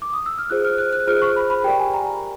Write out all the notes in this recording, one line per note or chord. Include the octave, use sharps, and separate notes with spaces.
D6
D#6
E6
F6
F4 G#4 C5 F#6
F6
F#6
F#6
F4 G#4 C5 F6
C#6
B5
B5
G4 A#4 D5 G5
G#5
A#5